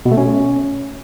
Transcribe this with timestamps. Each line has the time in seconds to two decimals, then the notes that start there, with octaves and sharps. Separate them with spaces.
0.06 B2
0.11 A3
0.17 C#4